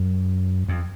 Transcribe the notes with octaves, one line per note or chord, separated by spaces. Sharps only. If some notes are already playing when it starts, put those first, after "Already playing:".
Already playing: F#2
F2